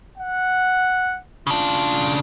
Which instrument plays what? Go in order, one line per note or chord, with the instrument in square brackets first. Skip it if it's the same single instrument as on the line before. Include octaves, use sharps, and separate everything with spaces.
[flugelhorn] F#5
[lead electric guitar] C#3 D4 [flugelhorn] F4